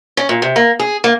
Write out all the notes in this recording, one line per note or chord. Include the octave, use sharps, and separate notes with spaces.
C#4
A#2
C3
A#3
G#4
A#3